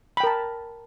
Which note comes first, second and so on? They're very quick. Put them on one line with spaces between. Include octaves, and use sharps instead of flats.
B5 G5 A#4 A5